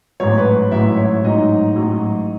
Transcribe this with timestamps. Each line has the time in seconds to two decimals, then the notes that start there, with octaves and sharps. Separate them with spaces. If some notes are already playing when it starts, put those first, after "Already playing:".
0.20 A1 G#2 F#3 C#5
0.37 B4
0.71 A1 G#2 F#3 E4 E5
0.97 C#5
1.24 A1 G#2 F#3 D#4 D#5
1.75 A1 G#2 F#3